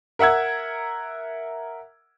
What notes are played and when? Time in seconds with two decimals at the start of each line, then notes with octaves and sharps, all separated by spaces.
0.19 A#4 E5 F#5 E6 G#6